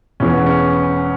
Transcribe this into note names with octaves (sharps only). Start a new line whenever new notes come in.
E1 E2 E3 C#4
B3
C#4